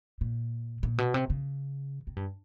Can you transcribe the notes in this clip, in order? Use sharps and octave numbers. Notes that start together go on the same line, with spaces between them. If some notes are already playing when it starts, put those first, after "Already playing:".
A#2
A#2
B2
C3
C#3
C3
G2